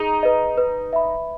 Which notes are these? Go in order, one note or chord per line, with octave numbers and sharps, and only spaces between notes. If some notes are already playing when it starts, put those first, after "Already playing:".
Already playing: D#4 G#4
B4 D#5
B4
E5 B5